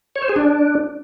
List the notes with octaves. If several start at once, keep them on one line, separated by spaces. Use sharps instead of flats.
C#5
C5
G#4
D4